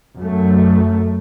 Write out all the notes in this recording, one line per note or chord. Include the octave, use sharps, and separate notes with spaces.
F#2 A3